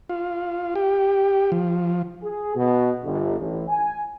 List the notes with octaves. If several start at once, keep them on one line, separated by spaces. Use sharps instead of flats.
F4
G4
F3
G#4
B2
G1
A1
G#5